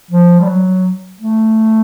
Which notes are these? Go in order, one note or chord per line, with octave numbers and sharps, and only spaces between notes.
F3
G3
F#3
A3